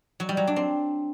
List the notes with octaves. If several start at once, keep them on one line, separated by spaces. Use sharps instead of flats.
F#3
G3
F#3
D4
C4